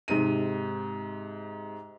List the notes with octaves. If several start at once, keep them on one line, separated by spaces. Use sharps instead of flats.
G#2 C3 D#7